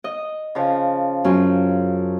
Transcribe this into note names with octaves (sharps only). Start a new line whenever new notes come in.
D#5
C#3 F3
F#2 C#4 F4